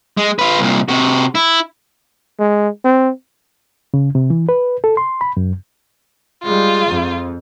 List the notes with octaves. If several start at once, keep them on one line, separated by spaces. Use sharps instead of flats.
G#3
F4 B4
C2 A#2
C3 F#4
E4
G#3
C4
C#3
C3
E3
B4
A4
C6
B5
F#2
G3 G#3 F4
F2